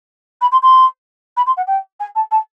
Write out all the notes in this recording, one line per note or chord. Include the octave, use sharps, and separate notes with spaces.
B5
C6
C6
B5
C6
F#5
G5
G#5
A5
A5